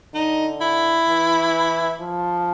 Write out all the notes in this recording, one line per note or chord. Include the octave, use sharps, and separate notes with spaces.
D3 D#4
E4
E3
F3